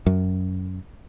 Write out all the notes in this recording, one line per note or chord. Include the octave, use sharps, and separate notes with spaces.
F#2